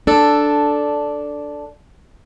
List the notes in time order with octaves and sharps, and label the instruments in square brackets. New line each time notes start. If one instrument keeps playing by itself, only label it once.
[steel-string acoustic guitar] D4 A4